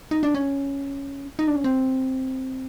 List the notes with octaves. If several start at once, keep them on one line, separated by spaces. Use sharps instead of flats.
D#4
D4
C#4
D#4
D4
C#4
C4